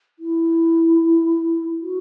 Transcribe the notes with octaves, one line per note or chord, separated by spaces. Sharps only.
E4
F#4